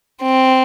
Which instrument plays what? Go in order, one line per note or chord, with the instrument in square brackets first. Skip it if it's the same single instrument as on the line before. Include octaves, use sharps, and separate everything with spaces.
[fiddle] C4